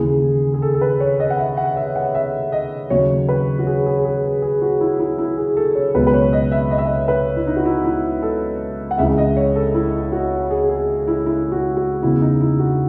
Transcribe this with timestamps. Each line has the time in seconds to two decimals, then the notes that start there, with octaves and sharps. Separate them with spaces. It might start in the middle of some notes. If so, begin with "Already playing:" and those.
Already playing: D#2 C#3 E3 G#4
0.54 G#4
0.62 A4
0.74 A4
0.81 B4
1.00 C#5
1.20 D#5
1.30 F#5
1.39 E5
1.57 F#5
1.77 E5
1.96 F#5
2.15 E5
2.52 D#5
2.90 D#2 C#3 F#3 C#5
3.29 B4
3.59 F#4
3.67 G#4
3.86 G#4
4.05 G#4
4.24 G#4
4.42 G#4
4.62 F#4
4.81 E4
4.99 E4
5.18 E4
5.37 G#4
5.57 A4
5.75 C#5
5.94 C#2 B2 F#3 B4
6.07 B4
6.14 C#5
6.33 D#5
6.52 E5
6.71 D#5
6.78 E5
6.85 D#5
7.08 B4
7.37 E4
7.47 D#4
7.56 F#4
7.66 E4
7.84 E4
8.22 A4
8.91 F#5
8.98 C#2 C#3 E3 E5
9.18 D#5
9.37 C#5
9.56 A4
9.74 E4
10.12 F#4
10.50 G#4
10.69 G#4
11.07 E4
11.26 E4
11.52 F#4
11.77 F#4
12.03 E2 C#3 E3 E4
12.21 D#4
12.41 E4
12.59 F#4